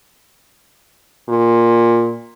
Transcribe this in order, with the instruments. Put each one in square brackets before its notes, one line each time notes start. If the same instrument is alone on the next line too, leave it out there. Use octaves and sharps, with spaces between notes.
[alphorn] A#2